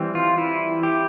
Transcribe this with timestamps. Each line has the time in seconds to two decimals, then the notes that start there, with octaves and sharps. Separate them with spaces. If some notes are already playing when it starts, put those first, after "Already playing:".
Already playing: E3 G3 C4
0.15 F4
0.38 E4
0.83 G4